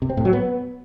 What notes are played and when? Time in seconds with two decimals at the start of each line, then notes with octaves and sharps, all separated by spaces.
0.02 C3
0.10 C4
0.17 A2
0.25 F#3
0.33 B3